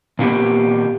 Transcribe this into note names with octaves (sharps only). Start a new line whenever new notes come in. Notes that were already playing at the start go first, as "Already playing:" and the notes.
A#2 A#3 B3 G4